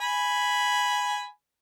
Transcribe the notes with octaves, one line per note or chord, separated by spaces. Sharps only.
G#5 B5